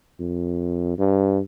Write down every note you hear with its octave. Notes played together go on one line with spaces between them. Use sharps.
F2
G2